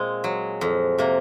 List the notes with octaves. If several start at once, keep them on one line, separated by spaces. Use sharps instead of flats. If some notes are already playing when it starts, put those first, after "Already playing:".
Already playing: A#2 G#3 C4
F#3
F2
C3 A#3